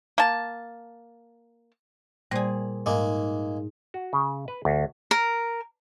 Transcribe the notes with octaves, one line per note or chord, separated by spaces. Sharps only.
A#3 A5
A#2 G3 G#4 C5
G#2 G#3 A#3
F#4
C#3
B4
D2
A#4